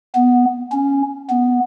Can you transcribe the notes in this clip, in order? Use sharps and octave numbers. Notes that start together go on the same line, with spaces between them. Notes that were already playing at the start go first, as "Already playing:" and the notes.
B3
C#4
B3